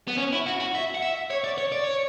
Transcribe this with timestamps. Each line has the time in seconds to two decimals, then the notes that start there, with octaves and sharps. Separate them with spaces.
0.08 B3
0.18 C#4
0.33 E4
0.46 F#4
0.60 F#4
0.75 E5
0.95 F#5
1.02 E5
1.30 C#5
1.44 D5
1.58 C#5
1.72 D5
1.84 C#5